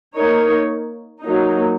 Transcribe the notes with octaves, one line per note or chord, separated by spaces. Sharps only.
A#3 D#4 A#4 C#5
F#3 A#3 D#4